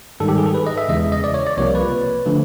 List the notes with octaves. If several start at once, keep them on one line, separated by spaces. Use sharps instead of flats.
G#2 D#3 G3 A4
G4
G#4
A4
B4
D#5
E5
E2 C#3 E3 G#3 D#5
D#5
D5
C#5
D5
C2 C3 F3 A#3 C#5
B4
D3 F3 A3